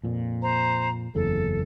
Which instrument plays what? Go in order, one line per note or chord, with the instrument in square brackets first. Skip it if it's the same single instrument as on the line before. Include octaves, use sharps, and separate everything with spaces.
[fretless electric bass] F2 A#2
[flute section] C5 A#5
[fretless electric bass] F#1 E2 C#3 [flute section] A4